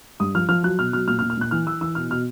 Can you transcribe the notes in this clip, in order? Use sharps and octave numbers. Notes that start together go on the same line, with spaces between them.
G2 D#6
F3 F6
F3 F6
F#3 F#6
B2 F6
F#3 F6
A#2 F6
F6
A#2
F6
A#2 F#6
E3 F6
E3 E6
E3 E6
B2 F6
B2 F6